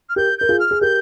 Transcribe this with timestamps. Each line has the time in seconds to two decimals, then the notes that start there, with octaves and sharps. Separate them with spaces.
0.09 F6
0.16 G4 A#4 G6
0.38 A#4 G6
0.49 F4 G#4
0.59 F6
0.71 G#4
0.81 G4 A#4 G6